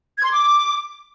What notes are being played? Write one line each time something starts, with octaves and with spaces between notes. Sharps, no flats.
G#6
C6
D6